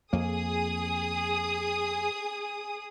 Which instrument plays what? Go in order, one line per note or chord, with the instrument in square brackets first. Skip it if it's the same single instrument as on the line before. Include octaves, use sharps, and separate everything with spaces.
[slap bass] F2 A#3 [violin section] G#4 D#6